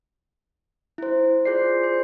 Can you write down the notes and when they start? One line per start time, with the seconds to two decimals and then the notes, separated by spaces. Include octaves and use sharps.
0.98 E4 C5
1.45 F4 G#4 C5 D5 C7
1.84 C5